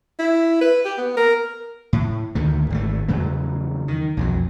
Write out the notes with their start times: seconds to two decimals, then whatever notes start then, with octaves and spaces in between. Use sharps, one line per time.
0.19 E4
0.61 B4
0.85 G4
0.98 B3
1.17 A#4
1.93 A2
2.35 D2 D#3 A3
2.70 G#1 B2 A3
3.08 E2 C#3 F#3 A3
3.88 D#3
4.17 B1 F2 F#3